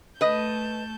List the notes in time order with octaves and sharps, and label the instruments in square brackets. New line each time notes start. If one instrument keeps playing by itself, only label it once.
[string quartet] A3 A5 G6 [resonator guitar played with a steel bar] B4 D#5